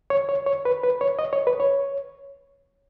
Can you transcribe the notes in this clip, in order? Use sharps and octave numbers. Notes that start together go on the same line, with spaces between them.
C#5
C#5
C#5
B4
B4
C#5
D#5
C#5
B4
C#5